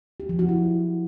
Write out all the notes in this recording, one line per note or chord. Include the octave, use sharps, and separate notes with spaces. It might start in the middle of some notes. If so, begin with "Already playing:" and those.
G4
F3
F#4
E4